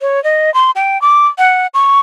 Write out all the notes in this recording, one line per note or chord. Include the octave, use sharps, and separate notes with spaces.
C#5
D#5
C6
G5
D6
F#5
C#6